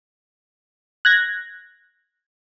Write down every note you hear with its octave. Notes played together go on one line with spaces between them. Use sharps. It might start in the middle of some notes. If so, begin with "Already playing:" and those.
F#6 G#6 A#6